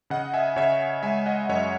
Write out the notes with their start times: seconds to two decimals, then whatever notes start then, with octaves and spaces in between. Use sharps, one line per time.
0.10 C#3 D#5 F#5
0.34 E5 G#5
0.56 C#3 C#5 E5
1.03 G#3 E5 G#5
1.26 D#5 F#5
1.49 F#2 C#5 E5